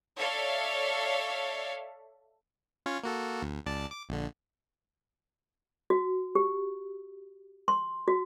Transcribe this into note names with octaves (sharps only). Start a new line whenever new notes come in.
A4 C#5 D5 E5 F5
C#4 F4 C#5
A#3 F#4 A4
D2
C#2 D5 A5
D6
A#1 D3
F#4
G4
C6
F#4